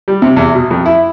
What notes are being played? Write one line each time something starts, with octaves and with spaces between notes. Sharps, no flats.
G3
C3
E2
B2
F2
E4